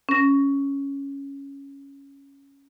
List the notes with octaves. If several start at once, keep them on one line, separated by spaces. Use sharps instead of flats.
C#4 A#6